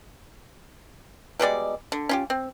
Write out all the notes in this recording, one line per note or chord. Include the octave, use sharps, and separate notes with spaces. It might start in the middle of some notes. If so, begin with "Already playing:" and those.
B2 G3 G#3 D5
D3
C#4 F4 G4
C4